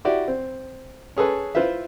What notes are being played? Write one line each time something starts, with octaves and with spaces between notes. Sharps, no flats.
E4 F#4 G4 D5
C4
C#4 G#4 A4 B4
E4 F4 B4 C5 E5